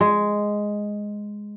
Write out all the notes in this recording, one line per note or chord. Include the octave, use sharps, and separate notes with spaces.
G#3